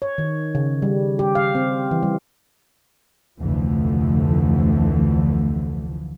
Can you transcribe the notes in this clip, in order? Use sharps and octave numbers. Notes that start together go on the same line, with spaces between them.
C#5
D#3
C#3
G3
G4
F5
C4
E3
G3
F1 D2 D3 E3 F3 A3